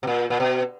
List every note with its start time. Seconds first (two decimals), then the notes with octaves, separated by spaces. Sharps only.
0.03 B2
0.07 A#2
0.30 A#2
0.40 B2